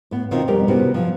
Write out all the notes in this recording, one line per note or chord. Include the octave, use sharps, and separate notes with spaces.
A2 B3
B2 D#3 C4 E4 F4
F2 B2 G3 G4 A#4
C3 B3 C#4 E4 F#4
F3 F#3